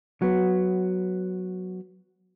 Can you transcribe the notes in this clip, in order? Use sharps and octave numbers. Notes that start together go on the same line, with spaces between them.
F#3 B3